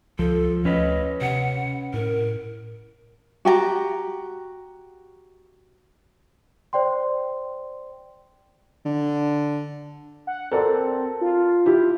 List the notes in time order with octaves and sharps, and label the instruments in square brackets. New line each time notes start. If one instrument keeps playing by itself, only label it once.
[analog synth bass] C#2 [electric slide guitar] F3 [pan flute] A4
[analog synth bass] D2 [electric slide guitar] C#4 B4 [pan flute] D#5
[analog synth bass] C3 [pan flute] F#5
[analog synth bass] A2 [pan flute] A#4
[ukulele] F#4 G4 G5 A#5
[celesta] C5 D5 G5 C6
[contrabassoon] D3
[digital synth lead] F#5
[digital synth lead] C4 [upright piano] A4 A#4 D5
[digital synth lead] F4
[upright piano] E4 G4